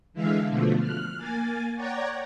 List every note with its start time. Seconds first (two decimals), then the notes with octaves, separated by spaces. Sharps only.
0.13 D3 E3 G#3 E5 F5
0.48 B2 D3 F3 A3
0.78 F6 F#6
1.17 A#3 G#5 A6
1.75 C#5 D5 F#5 G5 A#5 G#6